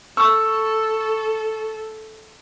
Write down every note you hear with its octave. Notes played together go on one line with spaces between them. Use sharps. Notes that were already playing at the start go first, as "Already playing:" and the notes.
A4 C#6 E6